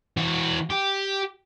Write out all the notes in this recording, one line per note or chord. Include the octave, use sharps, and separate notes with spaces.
E3 F#4
G4